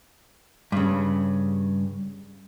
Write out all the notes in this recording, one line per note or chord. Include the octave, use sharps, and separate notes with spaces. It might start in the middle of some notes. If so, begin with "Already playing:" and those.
G2 C#3